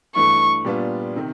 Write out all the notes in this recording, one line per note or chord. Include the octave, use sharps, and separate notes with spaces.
G2 E3 A3 C#6
A#2 G3 B3 D4 F4
C3 D#3